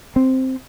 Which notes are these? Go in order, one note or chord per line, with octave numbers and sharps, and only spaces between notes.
C4